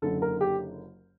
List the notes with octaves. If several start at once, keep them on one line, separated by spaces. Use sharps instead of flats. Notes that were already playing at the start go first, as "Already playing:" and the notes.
F#1 F#2 D3 A4
A#4
G4